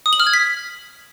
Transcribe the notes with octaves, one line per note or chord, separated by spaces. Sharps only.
D#6
F#7
F6
G#6
B6